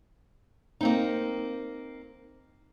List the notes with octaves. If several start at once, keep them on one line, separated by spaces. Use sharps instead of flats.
A#3 C4 D#4